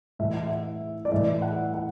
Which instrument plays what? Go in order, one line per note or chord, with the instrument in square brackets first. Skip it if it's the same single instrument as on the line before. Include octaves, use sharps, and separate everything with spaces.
[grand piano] A2 E3 E5
F#5
E5
D5
A2 E3 E5
F#5
F#5